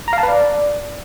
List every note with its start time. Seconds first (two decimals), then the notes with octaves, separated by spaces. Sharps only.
0.08 A#5
0.13 F5
0.18 A5
0.23 B4
0.28 D5